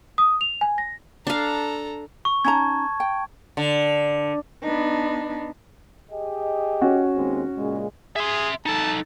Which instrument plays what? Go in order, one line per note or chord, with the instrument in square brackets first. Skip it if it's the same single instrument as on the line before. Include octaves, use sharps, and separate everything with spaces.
[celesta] D#6
F7
G#5
A#6
[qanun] D4 F5 [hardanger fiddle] A4 A#5
[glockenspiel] C#6
[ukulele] C#4 D#4 A#5 [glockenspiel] A5 G#6
[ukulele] G5
[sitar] D3
[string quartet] B3 D4 D#4
[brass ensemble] G4 G#4 D#5
[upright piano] C#4 F#4
[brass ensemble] D#2 G#3 C4
A#2 C#3 G#3
[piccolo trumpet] G#4 [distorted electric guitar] E5 C6
[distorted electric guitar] D#4 A4 [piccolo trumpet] A5